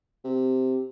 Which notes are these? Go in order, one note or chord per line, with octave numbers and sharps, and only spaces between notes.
C3